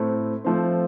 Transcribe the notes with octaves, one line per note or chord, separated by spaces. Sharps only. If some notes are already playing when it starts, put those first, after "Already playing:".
Already playing: A2 A3 C4
F3 A3 C4